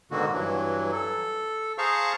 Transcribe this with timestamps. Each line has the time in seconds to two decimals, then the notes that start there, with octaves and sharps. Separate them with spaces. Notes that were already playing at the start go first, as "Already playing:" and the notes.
0.11 G#2 B2 D3 D#3 A#3 F#4
0.33 G2 E3 F#3
0.92 A4
1.78 G#4 C5 F5 A5 A#5 C#6